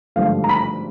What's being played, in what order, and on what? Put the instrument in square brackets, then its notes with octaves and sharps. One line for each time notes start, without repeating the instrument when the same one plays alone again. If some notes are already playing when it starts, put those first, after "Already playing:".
[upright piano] G#1 G2 D3 F3 A3 F5
A#5
B5